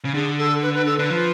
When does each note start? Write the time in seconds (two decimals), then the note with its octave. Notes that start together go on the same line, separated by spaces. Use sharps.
0.05 C#3
0.14 D3 G#4
0.37 A4
0.62 B4
0.74 B4
0.86 A4
0.98 D3 B4
1.10 F3